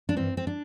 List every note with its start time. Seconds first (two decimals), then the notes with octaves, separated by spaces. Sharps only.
0.09 D4
0.16 G2 E3 C4
0.37 C4
0.47 D4